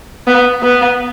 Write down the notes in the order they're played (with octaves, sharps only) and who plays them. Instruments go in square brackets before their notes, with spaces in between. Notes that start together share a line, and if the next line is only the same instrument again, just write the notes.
[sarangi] B3
B3